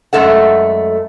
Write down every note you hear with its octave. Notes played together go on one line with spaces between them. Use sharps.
F#2 G#3 A3 A4 F#5